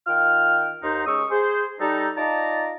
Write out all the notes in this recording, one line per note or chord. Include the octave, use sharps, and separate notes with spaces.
D#3 F4 G5 F6
D#2 D#4 C5
G#3 C#4 C#6 D#6 E6
G#4 C5
G3 D#4 A4
D#4 F4 D5 A5 A#5